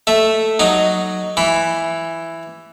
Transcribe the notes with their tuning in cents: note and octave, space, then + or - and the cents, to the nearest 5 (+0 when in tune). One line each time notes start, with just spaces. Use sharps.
A3 +0 E5 +0
F#3 +0 D#4 +0
E3 +5 B5 +0